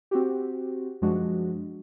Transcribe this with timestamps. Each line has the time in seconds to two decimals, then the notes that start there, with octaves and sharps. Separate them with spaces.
0.11 C4 F#4 G4
1.02 F#2 F3 G#3 D4 F#4